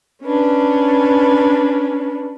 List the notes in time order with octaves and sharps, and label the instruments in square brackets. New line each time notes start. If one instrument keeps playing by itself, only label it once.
[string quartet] C#4 D4 B4